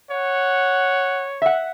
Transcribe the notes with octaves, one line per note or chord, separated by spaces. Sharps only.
C#5 F#5
E5 F#5